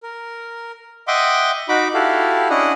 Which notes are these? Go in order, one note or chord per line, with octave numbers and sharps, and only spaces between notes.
A#4
D#5 E5 F#5 G5 C6 D6
D#4 F#4 B5 D6
E4 F#4 G4 A4 F5
C#4 D4 E4 D#5 F#5